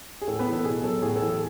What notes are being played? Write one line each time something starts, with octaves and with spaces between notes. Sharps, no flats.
G#4
A2 A4
B3 B4
E3
A4
B2 G#4
F#3 A4
A2 G#4
A4
E3
G#4